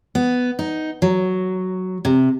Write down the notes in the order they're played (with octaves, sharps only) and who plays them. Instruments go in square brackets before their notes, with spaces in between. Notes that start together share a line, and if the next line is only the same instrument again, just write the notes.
[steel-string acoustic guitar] B3
D#4
F#3
C3